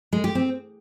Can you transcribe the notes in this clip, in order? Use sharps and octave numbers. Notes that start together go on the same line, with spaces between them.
G#3
G4
C4